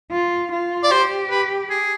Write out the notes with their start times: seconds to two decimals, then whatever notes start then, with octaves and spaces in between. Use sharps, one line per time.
0.11 F4
0.52 F4
0.83 D5
0.91 G4 C5
1.31 B4
1.70 G#4